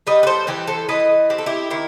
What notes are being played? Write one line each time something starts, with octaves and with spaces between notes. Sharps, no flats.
G3 B4 D#5
B4
A4 C5
E3 G4 B4
A4 C5
E3 B4 D#5
C4 G4
A4
E4 G4
D#3 E4